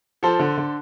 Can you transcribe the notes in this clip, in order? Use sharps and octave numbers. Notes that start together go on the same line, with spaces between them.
F3 A4 C5
D3
D3